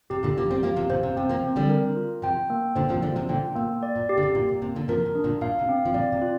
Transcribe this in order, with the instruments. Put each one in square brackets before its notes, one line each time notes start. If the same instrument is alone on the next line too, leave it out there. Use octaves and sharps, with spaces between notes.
[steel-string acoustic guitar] C3 [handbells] G4
[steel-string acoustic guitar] A#2 D3
[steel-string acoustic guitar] F3 A#3 [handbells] G4
[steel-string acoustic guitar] G3 C4
[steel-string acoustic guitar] F3 A#3 [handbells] F5
[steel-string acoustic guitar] C3 F3
[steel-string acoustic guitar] A#2 D3 [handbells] C5
[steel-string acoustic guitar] C3
[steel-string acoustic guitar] C3 [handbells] C4
[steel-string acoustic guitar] F3 A#3
[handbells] C4
[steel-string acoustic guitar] D3 G3
[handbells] A#4
F4
[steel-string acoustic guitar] C3 F3 [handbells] G5
[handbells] A#3
[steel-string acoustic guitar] A#2 D3 [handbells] C5
[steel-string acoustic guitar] C3 F3
[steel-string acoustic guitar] D3 G3 [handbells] F4
[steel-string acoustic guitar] C3 F3
[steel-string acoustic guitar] A#2 D3 [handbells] G5
[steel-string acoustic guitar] A#2 [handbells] A#3
[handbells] D5
[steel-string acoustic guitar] A#2
[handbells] G4
[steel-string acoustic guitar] D3
C3
[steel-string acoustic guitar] A#2 [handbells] A#3
[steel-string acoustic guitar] A#2
[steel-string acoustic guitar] C3 [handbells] A#3
[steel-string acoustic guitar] A#2 D3
[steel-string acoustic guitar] C3 F3 [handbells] A#4
[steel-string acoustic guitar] C3
[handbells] D4
[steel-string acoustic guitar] A#2 D3
[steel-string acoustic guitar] A#2 [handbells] F5
[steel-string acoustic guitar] C3
[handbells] C4
[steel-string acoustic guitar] F3
[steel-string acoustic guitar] A#2 D3 [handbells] D5
[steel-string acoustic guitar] C3
[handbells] F4